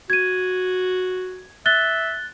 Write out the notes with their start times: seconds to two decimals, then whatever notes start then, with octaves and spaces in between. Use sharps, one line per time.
0.10 F#4 G#6 D#7
1.66 E5 F#6 A6 G7